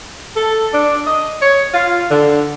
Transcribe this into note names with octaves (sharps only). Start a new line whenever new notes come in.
A4
D4
D#5
C#5
F4
D3